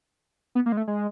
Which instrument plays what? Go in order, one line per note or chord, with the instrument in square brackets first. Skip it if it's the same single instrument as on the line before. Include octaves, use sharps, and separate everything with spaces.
[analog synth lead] B3
A#3
G#3
A3
G#3